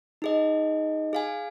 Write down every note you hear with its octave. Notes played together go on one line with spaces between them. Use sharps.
D#4 G#4 D#5
G#4 F5 G#5